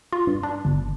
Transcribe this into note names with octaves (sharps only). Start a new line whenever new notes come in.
F4
G2
D4
G1